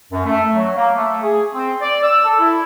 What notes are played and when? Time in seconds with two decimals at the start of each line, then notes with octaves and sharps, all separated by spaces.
0.12 F#2
0.25 A3
0.53 F#3
0.76 A#3
0.95 A3
1.22 G#4
1.54 C4
1.81 D5
2.03 E6
2.24 A4
2.39 E4